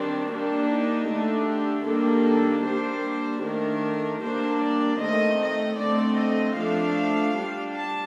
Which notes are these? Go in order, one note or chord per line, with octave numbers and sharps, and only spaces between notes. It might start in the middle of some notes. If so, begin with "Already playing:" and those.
Already playing: D#3 G3 C4 D4
G3 A#3 D4
D#4
D3 A3 D4
G4
D#3 G3 A#3 D4 A4
A4
G3 A#3 D4 C5
D#3 A3 D4 A#4
G3 A#3 D4 C5
D5
D#3 A3 C4 D#5
D#5
D3 A3 C4 D5
D#5
F3 A3 D4 F5
G3 D4
A5